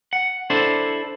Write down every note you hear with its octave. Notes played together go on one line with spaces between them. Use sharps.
F#5
D4 E4 A4 C5